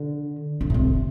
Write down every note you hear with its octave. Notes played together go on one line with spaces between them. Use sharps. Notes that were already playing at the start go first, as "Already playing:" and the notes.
Already playing: D3
D3
A2
C3